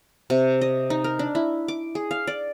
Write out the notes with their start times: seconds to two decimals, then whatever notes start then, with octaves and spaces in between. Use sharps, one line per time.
0.30 C3
0.61 D#5
0.90 D#4
1.04 A#4
1.19 D4
1.35 E4
1.68 D6
1.95 G#4
2.11 F5
2.27 D5